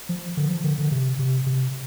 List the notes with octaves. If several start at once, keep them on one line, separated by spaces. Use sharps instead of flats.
F3
D3
F3
D3
D3
C3
C3
C3